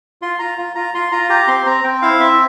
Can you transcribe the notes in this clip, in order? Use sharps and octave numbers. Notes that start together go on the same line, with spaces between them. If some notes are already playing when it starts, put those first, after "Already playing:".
F4 C6
F4 A#5
F4
F4 A#5
F4 C6
F4 A#5
G4 A#5
C4 C6
C4 A#5
C4 G5
E4 F5
C4 E5